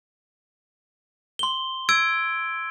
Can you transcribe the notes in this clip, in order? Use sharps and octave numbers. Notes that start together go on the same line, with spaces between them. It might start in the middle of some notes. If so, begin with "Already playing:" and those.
C6 G7
E6 G#6 D7